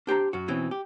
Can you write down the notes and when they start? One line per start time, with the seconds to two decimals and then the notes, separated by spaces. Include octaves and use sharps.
0.07 D4 G4 C5 A#5
0.33 F#2 F#4
0.48 B2 E3 C4 C#4
0.71 G4